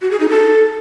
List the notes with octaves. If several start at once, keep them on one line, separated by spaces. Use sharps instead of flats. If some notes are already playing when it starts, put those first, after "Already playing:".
F#4
G#4
D#4
A4